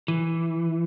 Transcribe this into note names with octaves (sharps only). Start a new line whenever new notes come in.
E3